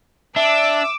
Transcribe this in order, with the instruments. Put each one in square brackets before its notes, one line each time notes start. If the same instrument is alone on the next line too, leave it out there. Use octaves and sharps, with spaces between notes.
[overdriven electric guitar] D4 [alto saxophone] E5 [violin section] D6 E6